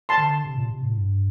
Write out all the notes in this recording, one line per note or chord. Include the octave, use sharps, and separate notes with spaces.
A5 C6
D3
C3
A#2
C3
A2
G2